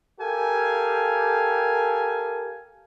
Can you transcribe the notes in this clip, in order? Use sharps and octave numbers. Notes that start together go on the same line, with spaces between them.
G4 A4 A#4 F5 G#5